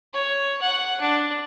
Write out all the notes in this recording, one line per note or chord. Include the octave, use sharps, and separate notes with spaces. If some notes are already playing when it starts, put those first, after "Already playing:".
C#5
F#5
D4